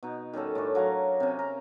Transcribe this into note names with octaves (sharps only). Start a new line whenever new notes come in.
B2 D#4
D#3 G3 C#4 A4
A2 C#4 D4
F#3 F5 G#5 A#5
C3 C#4
A#4